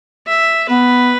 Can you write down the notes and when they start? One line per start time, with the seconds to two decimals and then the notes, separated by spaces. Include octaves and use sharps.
0.27 E5
0.69 B3 B4